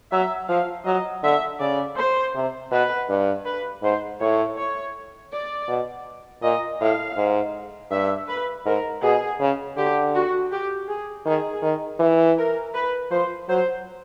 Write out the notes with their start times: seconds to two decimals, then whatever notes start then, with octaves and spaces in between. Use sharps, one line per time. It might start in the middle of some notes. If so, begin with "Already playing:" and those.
0.12 F#3 E5
0.49 F3 F5
0.86 F#3 D#5
1.23 D3 E5
1.60 C#3 D5
1.97 C5
2.35 C3
2.72 B2 B4
3.09 G2
3.46 B4
3.83 G#2 C5
4.20 A2 C#5
4.57 C#5
5.32 D5
5.68 B2
6.42 A#2 D#5
6.81 A2 F5
7.17 G#2
7.91 G2 E5
8.28 B4
8.66 G#2 A#4
9.03 B2 G#4
9.40 C#3
9.77 D3 G4
10.15 F#4
10.52 G4
10.88 G#4
11.26 D#3 G#4
11.63 D#3
12.00 E3
12.38 A#4
12.74 B4
13.11 F3 C5
13.49 F#3 C5